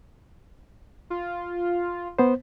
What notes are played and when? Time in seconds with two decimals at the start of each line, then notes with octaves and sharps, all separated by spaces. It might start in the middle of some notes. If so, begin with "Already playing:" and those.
1.10 F4
2.19 B3 C5